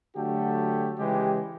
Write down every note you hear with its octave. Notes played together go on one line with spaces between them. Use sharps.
D3 F#3 A3 F#4 G4 A4
C#3 E3 G#3 G4